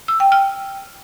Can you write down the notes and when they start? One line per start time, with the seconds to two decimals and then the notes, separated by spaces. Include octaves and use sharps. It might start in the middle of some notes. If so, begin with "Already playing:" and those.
0.08 E6
0.20 G5
0.32 F6